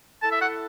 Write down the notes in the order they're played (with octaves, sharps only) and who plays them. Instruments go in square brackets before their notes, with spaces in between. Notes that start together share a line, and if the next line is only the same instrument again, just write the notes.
[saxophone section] E4 A4 [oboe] A5
[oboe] E5
F#5